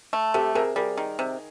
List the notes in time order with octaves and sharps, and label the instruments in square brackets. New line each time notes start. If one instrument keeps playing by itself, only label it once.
[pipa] A3
[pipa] C3 [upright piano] G4 A4
[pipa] C3 [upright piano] G#4 A#4
[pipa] G3 [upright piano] G#4 A#4
[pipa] D#3
C3